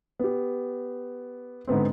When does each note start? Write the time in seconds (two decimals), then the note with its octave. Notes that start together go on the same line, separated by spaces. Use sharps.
0.19 B3 G4
1.67 G#2 D3 B3 C4